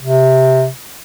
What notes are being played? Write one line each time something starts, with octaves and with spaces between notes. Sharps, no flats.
C3